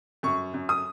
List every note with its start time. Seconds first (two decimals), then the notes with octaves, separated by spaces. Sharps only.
0.23 F#2 C#6
0.54 F#2
0.69 D#6